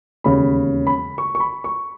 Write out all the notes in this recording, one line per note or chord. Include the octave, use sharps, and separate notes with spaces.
E1 D#2 C#3 B5
B5
C#6
C#6
B5
C#6